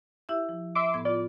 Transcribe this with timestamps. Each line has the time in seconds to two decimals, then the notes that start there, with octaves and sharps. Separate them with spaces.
0.29 E4 G4 E5
0.49 F3
0.75 E5 C6 D6
0.94 A2 B3 G#6
1.05 F4 D5